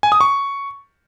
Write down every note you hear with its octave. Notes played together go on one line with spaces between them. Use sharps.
G#5
D#6
C#6